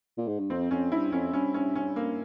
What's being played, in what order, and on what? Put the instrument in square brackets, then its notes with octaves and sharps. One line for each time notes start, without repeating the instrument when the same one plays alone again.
[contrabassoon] A#2
G#2
G2
[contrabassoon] F2 [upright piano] C4
[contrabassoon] F2 [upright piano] C#4
[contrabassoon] G2 [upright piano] E4
[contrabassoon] F2 [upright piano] C#4
[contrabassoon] G2 [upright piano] C#4
[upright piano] C#4
C#4
A#3